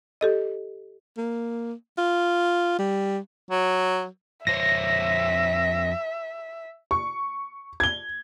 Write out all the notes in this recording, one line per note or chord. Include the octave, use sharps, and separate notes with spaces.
G4 A4 D#5
A#3
F4
G3
F#3
F2 C5 C#5 E5 A#6
C#6
G#6 G7